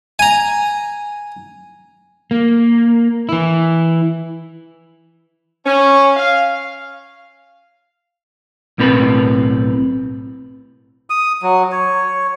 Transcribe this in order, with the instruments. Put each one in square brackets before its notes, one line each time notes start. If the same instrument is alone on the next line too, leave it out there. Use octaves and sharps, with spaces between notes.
[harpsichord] G#5 A#5
[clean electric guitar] A#3
E3 E4
[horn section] C#4
F5
[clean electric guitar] B1 A2 C4 A#4 B4
[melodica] D#6
F#3
C#5